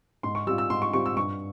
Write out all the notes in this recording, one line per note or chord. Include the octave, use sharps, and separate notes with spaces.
G#2 C6
C#6
G3 C4 F4 E6
E6
G#2 C6
C#6
G3 C4 F4 C#6
E6
G2 C#6